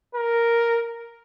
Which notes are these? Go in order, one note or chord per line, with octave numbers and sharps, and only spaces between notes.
A#4